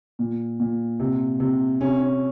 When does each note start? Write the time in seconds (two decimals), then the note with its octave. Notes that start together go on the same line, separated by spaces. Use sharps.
0.19 A#2
0.60 A#2
1.00 C3
1.40 C3
1.80 C3 C#4
2.00 C#4